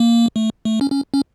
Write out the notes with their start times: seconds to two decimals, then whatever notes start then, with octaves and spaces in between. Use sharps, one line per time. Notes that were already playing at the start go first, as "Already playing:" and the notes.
Already playing: A#3
0.36 A3
0.65 A3
0.81 C#4
0.92 C#4
1.14 C#4